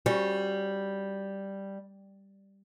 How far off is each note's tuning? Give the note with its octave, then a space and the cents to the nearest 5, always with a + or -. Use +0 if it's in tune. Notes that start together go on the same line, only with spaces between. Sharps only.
G3 +0 C#4 -20 F#4 +5